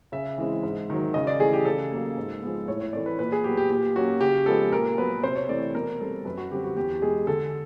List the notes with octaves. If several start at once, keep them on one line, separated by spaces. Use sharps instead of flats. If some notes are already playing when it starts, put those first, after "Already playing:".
C#3 E5
E3 G#3 C4
G#2
D#3 F#3
C#3 D#5
D5
E3 A3 G#4
G4
C#3 A4
F#3 A#3
G#2
F3 G#3 B3
A2 C#5
C#5
E3 A3 C4 D5
B4
A#2 B4
G#4
F#3 B3 G4
G4
A#2 G4
F#3 A#3 C#4 F#4
C#3 G4
F3 G#3 B3 A4
A#2 A#4
F#3 B3 B4
C3 C5
C#5
E3 A3 C4 D5
B2 A#4
G3 C4 A4
F#2 B4
F#4
D3 G3 C4 G4
F#4
E2 G4
B2 G#3 G#4
D3 A4